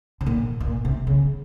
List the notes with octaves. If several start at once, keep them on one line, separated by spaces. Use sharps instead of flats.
C3
A#2
A#2
C3
C#3